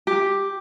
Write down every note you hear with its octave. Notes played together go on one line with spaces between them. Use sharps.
G4